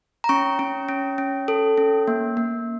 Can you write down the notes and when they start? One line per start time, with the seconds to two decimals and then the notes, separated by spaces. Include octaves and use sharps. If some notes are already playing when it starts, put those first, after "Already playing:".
0.24 A#5
0.29 C#4 C#6
0.59 C#4
0.89 C#4
1.18 C#4
1.48 A4
1.78 C#4
2.08 A#3
2.37 A#3